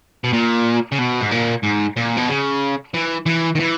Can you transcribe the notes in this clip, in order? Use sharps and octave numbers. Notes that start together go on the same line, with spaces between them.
B2
A#2
C#3
B2
G#2
A#2
G#2
A#2
B2
C#3
E3
E3
D#3
E3